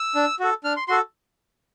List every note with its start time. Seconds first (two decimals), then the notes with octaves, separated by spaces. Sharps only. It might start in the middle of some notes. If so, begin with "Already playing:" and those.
Already playing: E6
0.15 D4
0.40 F#4 A4
0.64 D4 F6
0.77 C6
0.88 F#4 A4 C6